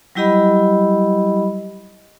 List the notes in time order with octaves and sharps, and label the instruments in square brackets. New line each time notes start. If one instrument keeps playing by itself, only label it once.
[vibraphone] F#3 G3 E4 G4 D#5 B5